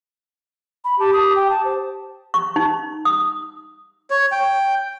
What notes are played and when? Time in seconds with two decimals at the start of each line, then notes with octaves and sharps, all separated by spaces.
0.84 B5
1.00 G4 A5
1.13 D#6
1.36 G5
1.50 A5
1.65 C5
2.34 C#6
2.56 D#4
3.05 D#6
4.10 C#5
4.32 G5